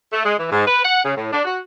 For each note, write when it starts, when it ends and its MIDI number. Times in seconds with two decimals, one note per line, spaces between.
0.12 0.23 57
0.25 0.34 56
0.37 0.50 52
0.50 0.62 44
0.65 0.83 71
0.83 1.00 78
1.03 1.13 49
1.15 1.31 45
1.32 1.41 62
1.45 1.57 66